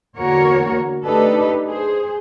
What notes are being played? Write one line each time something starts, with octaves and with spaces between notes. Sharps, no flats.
E2 D3 A#3 F#4 A#4 C#5
A3 D4 D#4 G4 A4 B4
G#4 C5